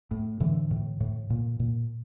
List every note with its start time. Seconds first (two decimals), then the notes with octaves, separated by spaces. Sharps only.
0.11 A2
0.40 A2 D3 E3
0.71 A2
1.00 A2
1.30 A#2
1.60 A#2